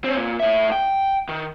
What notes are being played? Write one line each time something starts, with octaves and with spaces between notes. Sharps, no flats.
C4 C#4
A#2
A2 E5
G5
D#3